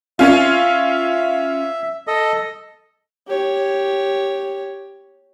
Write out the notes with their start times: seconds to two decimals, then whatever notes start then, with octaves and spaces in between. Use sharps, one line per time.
0.19 C#4 F4 E5
2.07 A4 D#5
3.27 G4 C#5